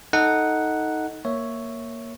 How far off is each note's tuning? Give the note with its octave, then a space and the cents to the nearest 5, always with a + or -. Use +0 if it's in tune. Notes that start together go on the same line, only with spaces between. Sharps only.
D#4 +10 A4 +5 F#5 +0
A#3 +0 C#5 +0 E5 +0